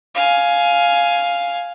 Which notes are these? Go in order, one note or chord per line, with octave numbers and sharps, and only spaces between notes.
F5 G#5